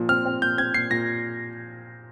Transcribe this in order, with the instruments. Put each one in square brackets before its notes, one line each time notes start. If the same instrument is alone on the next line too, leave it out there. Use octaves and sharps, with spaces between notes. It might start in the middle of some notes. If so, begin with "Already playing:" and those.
Already playing: [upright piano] A#2 F3
[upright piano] C4 [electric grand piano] F6
[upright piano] C4
[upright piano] A#2 [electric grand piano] G6
[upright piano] C4 [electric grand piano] G#6
[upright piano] A#2 [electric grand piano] C7
[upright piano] A#2 [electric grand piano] A#6